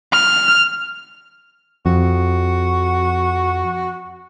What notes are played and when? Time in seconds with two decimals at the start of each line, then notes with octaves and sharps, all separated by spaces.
0.13 F6
1.86 F2 F#4